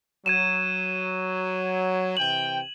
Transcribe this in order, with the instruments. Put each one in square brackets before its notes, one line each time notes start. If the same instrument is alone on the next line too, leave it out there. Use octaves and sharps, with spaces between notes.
[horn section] F#3 [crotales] G#6 D#7 E7
[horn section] C3 E3 G5 [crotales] F#7